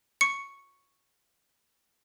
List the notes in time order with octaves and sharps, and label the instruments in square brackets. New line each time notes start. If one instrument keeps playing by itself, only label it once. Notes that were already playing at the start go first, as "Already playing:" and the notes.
[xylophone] C#6 C#7